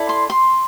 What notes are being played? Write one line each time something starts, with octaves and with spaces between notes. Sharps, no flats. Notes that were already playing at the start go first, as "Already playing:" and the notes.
Already playing: E4 A4 D5
C6
C6